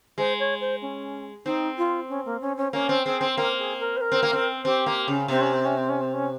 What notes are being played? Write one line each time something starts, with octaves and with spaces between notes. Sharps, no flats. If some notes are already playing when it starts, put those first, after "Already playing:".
G#3 C5
C#5
C5
C#4
C4 D#4
F4
C#4
A#3
C#4
C#4
A#3 C#4
C4
C4 G#4
C4
A#3 A#4
G#4
A#4
C5
A#4
C4
A#3
C4
C4 G4
A#3
C#3
C3 C4
C#4
C4
C#4
C4
C#4
C4
C#4